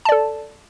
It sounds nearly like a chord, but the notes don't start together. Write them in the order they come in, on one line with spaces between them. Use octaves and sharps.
A5 D5 A4